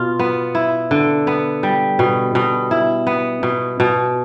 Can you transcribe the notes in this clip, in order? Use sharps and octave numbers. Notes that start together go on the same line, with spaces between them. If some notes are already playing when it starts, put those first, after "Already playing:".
Already playing: B2 F4
B3
E4
D3
B3
G3
B2
B2
E4
B3
B2
B2